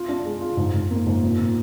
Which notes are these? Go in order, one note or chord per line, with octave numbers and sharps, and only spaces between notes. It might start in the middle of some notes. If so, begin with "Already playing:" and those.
Already playing: F4
D4
G#3
F4
G#2
G#2
A#3
G#2
A#2
A#2